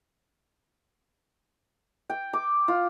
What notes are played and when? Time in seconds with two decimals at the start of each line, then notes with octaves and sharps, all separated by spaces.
2.10 G5
2.33 D6
2.68 F4